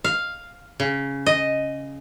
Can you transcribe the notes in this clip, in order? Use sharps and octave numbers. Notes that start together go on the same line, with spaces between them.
F5
C#3
D#5